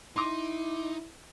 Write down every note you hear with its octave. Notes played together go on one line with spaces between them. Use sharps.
D#4 E4 C6 D6